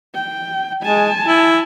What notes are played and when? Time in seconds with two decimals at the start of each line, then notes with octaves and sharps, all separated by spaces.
0.15 G5
0.83 G#3 G#5 A5
1.25 E4